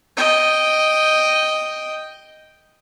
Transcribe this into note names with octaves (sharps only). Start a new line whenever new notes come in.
D#5 G5